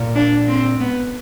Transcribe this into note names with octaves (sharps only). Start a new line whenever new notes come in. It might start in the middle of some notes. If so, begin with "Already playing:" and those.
Already playing: A#2
D4
C4
B3